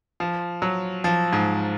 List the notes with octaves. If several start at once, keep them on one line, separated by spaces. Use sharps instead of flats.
F3
F#3
F3
G#2